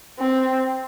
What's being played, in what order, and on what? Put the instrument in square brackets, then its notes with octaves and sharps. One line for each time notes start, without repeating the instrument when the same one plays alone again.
[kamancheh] C4